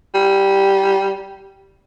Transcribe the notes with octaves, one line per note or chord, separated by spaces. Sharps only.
G3